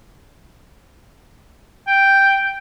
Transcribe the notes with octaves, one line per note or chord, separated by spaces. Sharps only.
G5